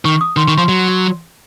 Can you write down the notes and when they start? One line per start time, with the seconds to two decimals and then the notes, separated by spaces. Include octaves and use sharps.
0.05 D#3 C#6
0.21 D#6
0.37 D#3 C6
0.48 D#3 C#6
0.58 F3 C6
0.68 F#3